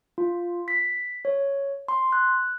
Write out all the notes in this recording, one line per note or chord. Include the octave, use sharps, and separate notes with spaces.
F4
B6
C#5
C6
F#6